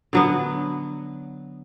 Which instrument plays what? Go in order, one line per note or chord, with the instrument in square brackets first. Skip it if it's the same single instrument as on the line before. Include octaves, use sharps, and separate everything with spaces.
[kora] D3 F#3 B3